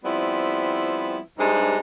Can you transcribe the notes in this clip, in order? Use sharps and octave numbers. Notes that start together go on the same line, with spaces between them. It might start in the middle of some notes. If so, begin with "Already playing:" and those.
F3 G3 B3 C4 E4
G2 C3 G#3 D4 D#4